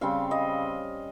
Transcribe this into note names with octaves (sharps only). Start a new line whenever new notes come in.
C#3 G3 C4 F5
D#5